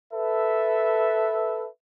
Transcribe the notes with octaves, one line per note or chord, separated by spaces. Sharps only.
A4 B4 E5